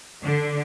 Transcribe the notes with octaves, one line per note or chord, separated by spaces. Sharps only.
D3